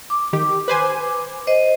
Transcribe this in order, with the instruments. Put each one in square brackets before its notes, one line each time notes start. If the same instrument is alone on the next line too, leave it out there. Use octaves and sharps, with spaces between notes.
[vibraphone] D6
[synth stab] D#3 G4
B4 C5 G#5
[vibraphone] C5 D#5